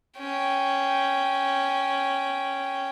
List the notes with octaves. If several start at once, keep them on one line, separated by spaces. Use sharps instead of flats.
C#4 G5